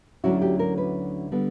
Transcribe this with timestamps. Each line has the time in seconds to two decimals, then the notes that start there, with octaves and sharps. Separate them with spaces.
0.24 D2 D3 F#3 C#4 E4 F#4
0.42 G4
0.59 A#4
0.78 B4
1.32 D3 G3 B3